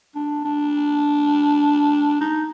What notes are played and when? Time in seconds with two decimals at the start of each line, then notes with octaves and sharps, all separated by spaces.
0.15 D4
0.45 D4
2.21 D#4